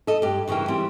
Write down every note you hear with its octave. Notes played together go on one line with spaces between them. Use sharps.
A4 D#5
G2 G4
G2 C#3 E3 A#4 G5
E3 G3 C4